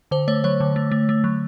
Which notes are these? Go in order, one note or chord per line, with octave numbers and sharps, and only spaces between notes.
D3 C5
A3 C#5
F#3 C#5
D3
A3
A3
A3
F#3